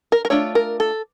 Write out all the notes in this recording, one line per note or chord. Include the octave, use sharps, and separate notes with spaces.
A#4
A#4
A3 D4 F4 C#5
A#4
A4